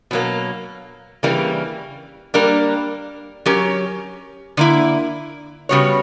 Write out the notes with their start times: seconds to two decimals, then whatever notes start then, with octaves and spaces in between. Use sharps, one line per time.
0.11 B2 F#3 A#3
1.23 C#3 E3 G3 A#3
2.34 G3 A#3 D4 A#4
3.46 F#3 C#4 G4 A#4
4.57 D3 A#3 E4
5.69 C#3 G3 B3 F#4 C#5